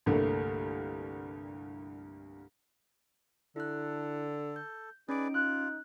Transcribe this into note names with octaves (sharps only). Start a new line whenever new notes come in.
C2 G2 D3 A3 A#3
D3 E4 A4 F#6
G6
C#4 D#4 G#4 B4 D5 D7
F4 F#6